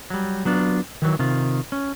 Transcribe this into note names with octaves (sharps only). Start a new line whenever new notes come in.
F#3 G3
F#3 B3 D4 F4
D#3 E3 F#3
C3 D#3 F4
C#4